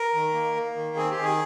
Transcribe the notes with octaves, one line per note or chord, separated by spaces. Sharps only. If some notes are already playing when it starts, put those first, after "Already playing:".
Already playing: A#4
D#3
A#3
A#3
D#3
C4 G#4
G4
D#3
G#4